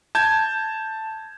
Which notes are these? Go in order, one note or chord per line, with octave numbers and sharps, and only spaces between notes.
A5 G6 G#6